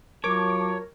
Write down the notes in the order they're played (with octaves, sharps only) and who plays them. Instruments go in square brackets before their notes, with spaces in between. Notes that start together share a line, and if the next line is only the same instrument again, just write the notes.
[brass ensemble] F#3 F4 A5 [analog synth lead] A#4 [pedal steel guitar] C#5 [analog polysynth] D6